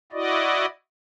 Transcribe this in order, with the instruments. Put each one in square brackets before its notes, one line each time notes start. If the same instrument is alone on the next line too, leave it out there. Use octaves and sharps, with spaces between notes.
[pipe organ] E4 F#4 D5 D#5